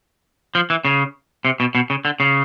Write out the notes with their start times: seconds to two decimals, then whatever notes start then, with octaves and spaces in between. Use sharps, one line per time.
0.55 F3
0.70 E3
0.85 C#3
1.45 C3
1.60 B2
1.75 B2
1.90 C#3
2.05 D3
2.20 C#3